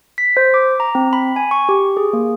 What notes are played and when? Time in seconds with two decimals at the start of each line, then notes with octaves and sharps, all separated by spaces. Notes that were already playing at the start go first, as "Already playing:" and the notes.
0.18 B6
0.37 C5
0.54 D6
0.80 A#5
0.95 C4
1.13 B5
1.36 G#5
1.51 C#6
1.69 G4
1.97 G#4
2.13 A#3